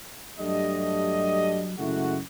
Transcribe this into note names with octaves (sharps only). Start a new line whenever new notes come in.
G2 F#3 A3 D4 G4 D#5
F#2 C#3 G#3 A3 E4 F#4